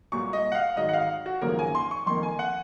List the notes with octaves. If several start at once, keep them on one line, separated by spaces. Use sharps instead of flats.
C2 A#2 F#3 C#6
D#5
F#5
F5
G#1 G#2 F#3 D#5
F#5
F5
F#4
G#1 F#2 C#3 F3 A#3 A#4
G#5
C6
C#6
F2 D#3 A#3 C6
G#5
F#5